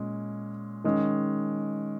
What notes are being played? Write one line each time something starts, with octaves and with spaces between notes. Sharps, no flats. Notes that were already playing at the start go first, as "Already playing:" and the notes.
Already playing: A#2 G#3 C#4
D#3 G#3 C#4